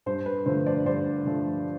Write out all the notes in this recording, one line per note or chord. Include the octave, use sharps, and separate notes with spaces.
G2 C5
B4
D3 F3 A3 C5
C5 D5
G2 C5 D5
D3 F3 A3